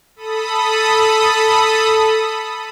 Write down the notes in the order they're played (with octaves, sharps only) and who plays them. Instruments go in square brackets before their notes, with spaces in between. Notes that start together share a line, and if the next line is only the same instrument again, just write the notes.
[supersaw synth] A4 B5 D#6